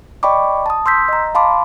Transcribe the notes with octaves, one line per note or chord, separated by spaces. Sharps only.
D5 D#5 G5 B5 C#6 D6
A5 D#6
C6 E6 G6 B6
D#5 A#5
F5 A5 B5 C6 D6